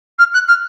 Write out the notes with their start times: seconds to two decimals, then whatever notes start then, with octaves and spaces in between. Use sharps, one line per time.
0.18 F6
0.33 F#6
0.48 F6